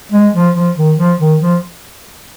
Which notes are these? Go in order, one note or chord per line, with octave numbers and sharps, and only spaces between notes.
G#3
F3
F3
D#3
F3
D#3
F3